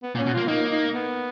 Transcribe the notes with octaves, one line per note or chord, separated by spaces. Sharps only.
B3
A#2
C#4
B2
A#3 F4
A#3 D#4
D#4
B3